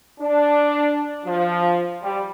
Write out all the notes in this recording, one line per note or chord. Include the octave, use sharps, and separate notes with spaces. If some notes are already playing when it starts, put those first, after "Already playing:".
D4
F3
G3